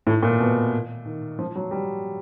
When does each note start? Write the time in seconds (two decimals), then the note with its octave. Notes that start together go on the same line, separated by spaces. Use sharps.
0.07 A2
0.23 A#2
0.40 B2
1.05 D#3
1.39 F3
1.56 F#3
1.71 G3